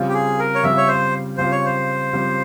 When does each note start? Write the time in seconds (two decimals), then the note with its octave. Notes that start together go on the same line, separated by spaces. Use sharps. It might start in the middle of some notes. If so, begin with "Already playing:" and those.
Already playing: C#3 G3 C4 F4
0.08 G4
0.14 G#4
0.39 A#4
0.55 C#5
0.63 C#3 G3 C4 F4 E5
0.77 C#5
0.88 C5
1.38 C#3 G3 C4 F4 C5
1.52 C#5
1.65 C5
2.13 C#3 G3 C4 F4